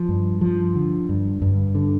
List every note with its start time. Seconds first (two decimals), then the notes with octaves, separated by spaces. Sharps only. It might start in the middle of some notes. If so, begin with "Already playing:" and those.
Already playing: F3
0.09 G2
0.41 F3
0.75 D3
1.09 G2
1.42 G2
1.75 D3